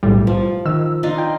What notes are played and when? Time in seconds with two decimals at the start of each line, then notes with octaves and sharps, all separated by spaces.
0.03 B1 A2 G3
0.27 F3
0.65 D#3 E6
1.03 D4 D#4 F4
1.18 G5